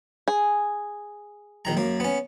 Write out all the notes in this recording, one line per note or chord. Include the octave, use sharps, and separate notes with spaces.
G#4
A#1 D#3 A#5
F#2 A#3
B3 C#4